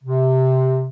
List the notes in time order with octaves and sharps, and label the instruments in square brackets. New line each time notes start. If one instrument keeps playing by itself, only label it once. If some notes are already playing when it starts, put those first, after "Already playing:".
[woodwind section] C3